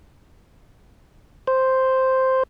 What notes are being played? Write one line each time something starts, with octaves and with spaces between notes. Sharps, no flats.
C5